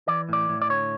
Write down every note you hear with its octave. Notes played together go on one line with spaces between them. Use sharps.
E3 D5
A2 D5
A2
D5
D3 C#5